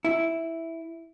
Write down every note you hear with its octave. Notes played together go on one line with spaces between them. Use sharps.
E4